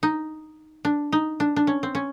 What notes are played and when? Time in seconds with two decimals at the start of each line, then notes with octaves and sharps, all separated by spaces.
0.03 D#4
0.85 D4
1.12 D#4
1.40 D4
1.56 D4
1.67 C#4
1.83 C4
1.95 C#4